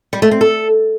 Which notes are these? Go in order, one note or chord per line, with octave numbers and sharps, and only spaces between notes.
G3
A3
C4
A4